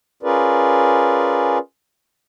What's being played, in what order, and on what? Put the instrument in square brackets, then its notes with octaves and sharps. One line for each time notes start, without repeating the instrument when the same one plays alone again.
[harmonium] C#4 F4 G#4 A#4 B4 D5